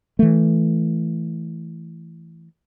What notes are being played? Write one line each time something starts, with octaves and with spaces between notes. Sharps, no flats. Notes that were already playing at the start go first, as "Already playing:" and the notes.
E3 A3